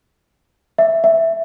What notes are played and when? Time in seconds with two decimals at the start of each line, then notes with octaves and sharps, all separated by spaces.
0.78 E5
1.04 E5